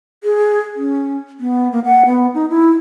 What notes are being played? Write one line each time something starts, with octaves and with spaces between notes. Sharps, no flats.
G#4
C#4
B3
A#3
F#5
B3
D#4
E4